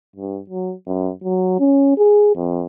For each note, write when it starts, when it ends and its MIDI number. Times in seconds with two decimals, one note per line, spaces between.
0.16 0.39 43
0.50 0.73 54
0.87 1.11 42
1.24 1.60 54
1.60 1.94 61
1.97 2.34 68
2.36 2.66 41